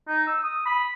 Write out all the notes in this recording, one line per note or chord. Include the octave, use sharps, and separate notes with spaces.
D#4
E6
D#6
B5